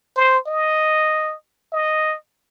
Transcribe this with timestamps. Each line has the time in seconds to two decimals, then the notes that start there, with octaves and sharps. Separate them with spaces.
0.16 C5
0.47 D#5
1.72 D#5